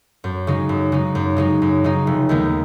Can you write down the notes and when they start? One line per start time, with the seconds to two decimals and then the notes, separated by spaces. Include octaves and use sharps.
0.24 F#2
0.47 C#3 G#3 D#4
0.69 F#2
0.92 C#3 G#3 D#4
1.15 F#2
1.37 C#3 G#3 D#4
1.62 F#2
1.84 C#3 G#3 D#4
2.07 F1
2.29 D#2 D#3 G#3 B3